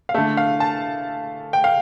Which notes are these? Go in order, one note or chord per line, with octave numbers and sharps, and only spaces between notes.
F5
D3 A3 E5
F5
A5
G5
F5